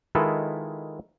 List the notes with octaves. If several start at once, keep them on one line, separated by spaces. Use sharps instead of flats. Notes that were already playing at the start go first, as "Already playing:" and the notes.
D#3 G#3 E4 F4 A4 B4